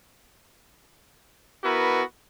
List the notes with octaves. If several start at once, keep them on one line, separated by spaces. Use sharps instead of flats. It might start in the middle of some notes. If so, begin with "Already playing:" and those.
B3 E4 F#4 A#4 B4